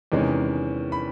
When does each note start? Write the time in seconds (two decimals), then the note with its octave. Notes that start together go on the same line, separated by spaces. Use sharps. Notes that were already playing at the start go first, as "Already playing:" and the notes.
0.12 E2 C3 D#3 G#3 C#4
0.92 B5